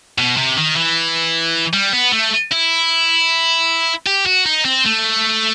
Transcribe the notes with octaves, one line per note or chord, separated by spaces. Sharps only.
B2
C3
D#3
E3
G3
B3
A3
E4
G4
F#4
D#4
C4
A3